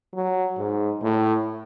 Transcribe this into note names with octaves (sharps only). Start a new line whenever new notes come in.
F#3
G#2
A2